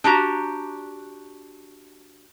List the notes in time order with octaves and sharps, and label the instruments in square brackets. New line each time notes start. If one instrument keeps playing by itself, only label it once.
[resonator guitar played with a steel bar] D4 F#4 G4 A#5